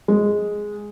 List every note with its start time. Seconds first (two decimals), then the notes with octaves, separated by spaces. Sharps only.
0.08 G#3